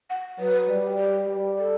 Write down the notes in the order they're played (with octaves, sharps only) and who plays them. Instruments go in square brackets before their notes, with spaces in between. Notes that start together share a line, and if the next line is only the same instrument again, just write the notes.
[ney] F#5
[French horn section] F#3 [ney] B4
[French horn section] G3
[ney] G4
[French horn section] G3
[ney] A4